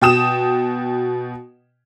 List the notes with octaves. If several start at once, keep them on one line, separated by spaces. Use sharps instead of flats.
B2 G5 D#6 E7